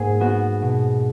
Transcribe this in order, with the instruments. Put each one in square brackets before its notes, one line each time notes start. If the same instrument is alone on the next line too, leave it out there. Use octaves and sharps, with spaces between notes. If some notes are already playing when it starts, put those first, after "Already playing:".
Already playing: [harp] G#2 A#3 G#4
B3 F#4
B2